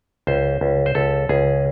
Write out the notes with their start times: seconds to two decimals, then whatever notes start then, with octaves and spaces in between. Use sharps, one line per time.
0.27 C#2 C5
0.61 C#2
0.86 C5
0.95 C#2 A4
1.29 C#2 G#4